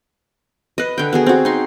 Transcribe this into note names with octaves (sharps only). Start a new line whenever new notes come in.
B4 D#5
D3 G5
B3 F#4 G#4
C4 F#4
D#4 C6